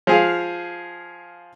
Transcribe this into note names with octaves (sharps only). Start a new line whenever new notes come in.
F3 G#4 F5